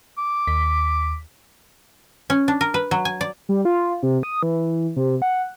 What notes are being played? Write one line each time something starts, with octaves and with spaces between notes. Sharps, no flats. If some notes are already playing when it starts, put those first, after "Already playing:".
D6
D#2 B6
C#4
D4
A#4
B4
F#3
G#5
D5
G3
F4
C3
D#6
E3
C3
F#5